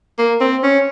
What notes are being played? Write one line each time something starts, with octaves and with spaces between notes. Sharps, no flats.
A#3
C4
C#4